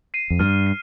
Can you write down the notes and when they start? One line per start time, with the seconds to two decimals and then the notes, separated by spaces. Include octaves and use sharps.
0.14 C7 D#7
0.30 F2
0.39 G2 F6
0.67 C7